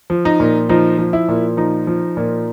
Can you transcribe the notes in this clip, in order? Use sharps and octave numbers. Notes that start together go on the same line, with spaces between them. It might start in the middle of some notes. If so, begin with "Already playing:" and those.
F3
D#4
A#2
F3 D#4
F3
E4
A#2
F3 D#4
F3
A#2